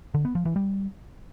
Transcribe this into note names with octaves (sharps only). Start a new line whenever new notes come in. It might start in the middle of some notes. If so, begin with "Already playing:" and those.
D3
B3
F3
E3
G3